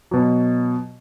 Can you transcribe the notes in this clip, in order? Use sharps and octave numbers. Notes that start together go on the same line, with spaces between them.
B2 F#3